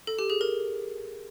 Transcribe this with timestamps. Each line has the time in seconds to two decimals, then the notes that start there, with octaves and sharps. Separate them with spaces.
0.07 A4
0.19 G4
0.30 G#4
0.41 A#4